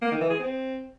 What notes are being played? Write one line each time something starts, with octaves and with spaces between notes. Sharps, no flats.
A#3
D#3
E3
G#4
C4